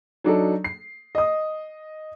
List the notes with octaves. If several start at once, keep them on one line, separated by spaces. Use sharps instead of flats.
F#3 D4 D#4 A4
C7
D#5 D#6